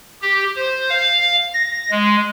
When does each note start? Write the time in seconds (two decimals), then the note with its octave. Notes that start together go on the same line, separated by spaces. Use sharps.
0.22 G4
0.56 C5
0.90 F5
1.54 A#6
1.91 G#3